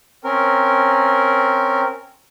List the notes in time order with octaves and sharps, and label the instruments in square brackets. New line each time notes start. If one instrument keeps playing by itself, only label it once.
[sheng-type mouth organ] C4 C#4 A#4